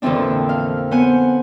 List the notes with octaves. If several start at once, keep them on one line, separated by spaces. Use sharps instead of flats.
F2 A#2 D3 E3 C4 D4
F5
B3 C5 F#5 G#5